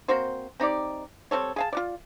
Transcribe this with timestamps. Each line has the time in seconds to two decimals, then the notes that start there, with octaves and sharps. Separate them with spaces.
0.08 A#3 C4 F#4 C5
0.60 C4 D#4 G4 D5
1.31 G3 C4 A4 C#5
1.56 G#4 F5 A5
1.73 F4 F#4 D5